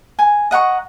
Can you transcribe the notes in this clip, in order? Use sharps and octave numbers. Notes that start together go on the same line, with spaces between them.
G#5
D#5 F#5 A#5 C#6